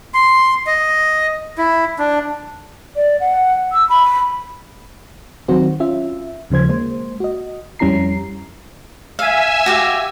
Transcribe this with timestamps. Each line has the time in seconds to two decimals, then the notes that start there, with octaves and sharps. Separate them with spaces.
0.14 C6
0.67 D#5
1.58 E4
1.99 D4
2.96 D5
3.20 F#5
3.73 E6
3.89 B5
5.48 D#3 F#3 C4 F#4 C5
5.80 C#4 F4 E5
6.50 D#2 C#3 F3 C5 G#6
6.69 G#3 A#3 C5
7.20 F#4 D#5
7.79 F2 G3 C#4 E4 A#5 C7
9.19 E5 F5 G#5 E6
9.66 F#4 G4 F5